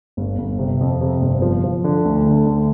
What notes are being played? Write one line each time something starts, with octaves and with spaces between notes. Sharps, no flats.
G1
G1
C3
F2
C3
G1
F3
F3
D3
D2
D3
D2